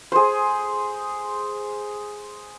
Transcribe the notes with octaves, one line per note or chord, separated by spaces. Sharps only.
G#4 C5